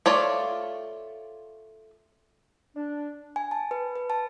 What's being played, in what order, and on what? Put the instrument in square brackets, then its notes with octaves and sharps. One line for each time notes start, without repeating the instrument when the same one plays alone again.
[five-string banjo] A3 F4 C#5 D5
[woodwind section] D4
[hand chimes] G#5
A5
B4
B4
A5